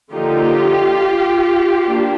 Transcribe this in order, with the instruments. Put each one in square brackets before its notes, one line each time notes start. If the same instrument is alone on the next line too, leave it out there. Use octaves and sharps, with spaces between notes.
[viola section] D3 F3 A#3 D#4 F4 G4
A#3 D4